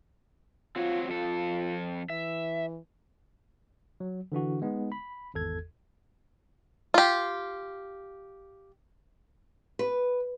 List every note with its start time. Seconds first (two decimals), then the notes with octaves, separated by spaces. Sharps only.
0.76 C4 F4 F#4 C#5
1.09 F2 F4 A4
2.10 E3 E5
4.00 F#3
4.32 D3 E3 D4 F#4
4.62 G#3 B3 D#4
4.92 B5
5.34 G#1 E2 A4 G#6
6.94 F4 G4
9.79 B4